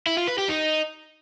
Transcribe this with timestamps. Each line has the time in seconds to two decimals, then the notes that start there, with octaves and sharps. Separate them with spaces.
0.07 E4
0.17 F4
0.28 B4
0.38 G4
0.49 D#4